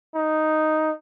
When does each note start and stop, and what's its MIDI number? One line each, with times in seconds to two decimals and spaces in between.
0.15 0.91 63